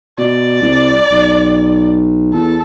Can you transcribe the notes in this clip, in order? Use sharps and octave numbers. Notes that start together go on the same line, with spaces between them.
B2 D5
C2
B1
E2 A4